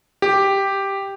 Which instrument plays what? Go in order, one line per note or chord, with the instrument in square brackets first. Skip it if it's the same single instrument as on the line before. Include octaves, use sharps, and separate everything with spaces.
[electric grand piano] G4